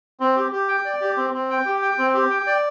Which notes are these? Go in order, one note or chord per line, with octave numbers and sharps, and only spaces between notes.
C4
G4
G4
G5
D5
G4
C4
C4
G5
G4
G5
C4
G4
G5
D5